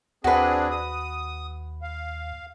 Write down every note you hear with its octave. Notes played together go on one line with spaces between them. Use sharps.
D#2 C4 D4 F#4 G#4 B4
D#6
F5